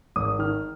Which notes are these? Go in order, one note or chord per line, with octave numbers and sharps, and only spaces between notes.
G#1 D#6
D#3 F6